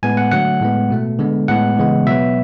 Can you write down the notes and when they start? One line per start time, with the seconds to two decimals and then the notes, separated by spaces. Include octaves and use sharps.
0.03 A2 G#3 B3 G#5
0.17 F#5
0.32 D3 F#3 A3 F#5
0.61 A2 G#3 B3
0.90 B2 A3
1.19 D3 G#3 B3
1.48 A2 G#3 B3 F#5
1.78 C#3 E3 G#3 B3
2.07 B2 F#3 B3 E5